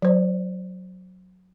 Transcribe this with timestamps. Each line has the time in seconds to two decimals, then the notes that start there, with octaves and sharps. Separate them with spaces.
0.02 F#3 C5 D5